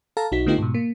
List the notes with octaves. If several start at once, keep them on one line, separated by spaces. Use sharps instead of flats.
A4 F5 A5 A#5
B1 D#4 F#4 B6
D3 A3 B3 D#4 F4 G4
G#2 B2
A#3